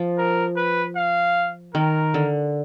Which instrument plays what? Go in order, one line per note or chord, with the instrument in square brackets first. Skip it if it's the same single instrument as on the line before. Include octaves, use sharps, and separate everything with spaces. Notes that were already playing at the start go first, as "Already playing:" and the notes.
Already playing: [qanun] F3
[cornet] A#4
B4
F5
[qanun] D#3 [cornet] A#4
[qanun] D3